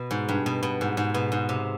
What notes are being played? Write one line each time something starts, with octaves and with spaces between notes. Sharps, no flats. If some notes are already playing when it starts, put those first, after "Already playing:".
Already playing: B2
G#2
G2
B2
B2
G#2
G#2
B2
G#2
C3